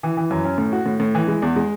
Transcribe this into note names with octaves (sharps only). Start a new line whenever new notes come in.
E3
E3
F#2
C#4
A2
F#4
A2
A2
E3
G#3
E2
G#3